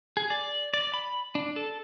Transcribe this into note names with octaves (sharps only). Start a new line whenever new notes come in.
G#4
D5
D5
B5
D4
A4